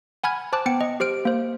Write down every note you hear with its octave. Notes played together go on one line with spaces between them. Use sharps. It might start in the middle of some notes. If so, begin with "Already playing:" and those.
F#5 G#5 B5 F6 G#6
C5 A5 D6 F#6
B3 G5 C#7
D#5
G4 C5 F6 D7
A#3 C5